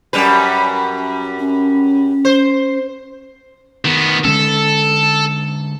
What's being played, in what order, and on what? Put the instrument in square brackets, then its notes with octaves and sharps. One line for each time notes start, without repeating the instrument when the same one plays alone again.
[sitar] F#2 G3 B4
[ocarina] C#4
[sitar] C5
[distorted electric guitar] D#3 B3
[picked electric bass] D3 G#3 C#4 [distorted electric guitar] A4